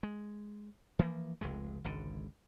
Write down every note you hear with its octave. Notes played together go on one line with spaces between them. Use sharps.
G#3
E3 F3 A#3
F1 C#2 C3 G#3
G#1 C#2 D3